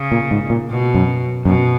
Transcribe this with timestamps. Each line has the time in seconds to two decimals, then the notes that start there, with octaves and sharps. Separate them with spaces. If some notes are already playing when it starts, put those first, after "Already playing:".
Already playing: C#3
0.12 A#2
0.31 G#2
0.50 A#2
0.70 B2
0.94 F#2
1.45 F#2 B2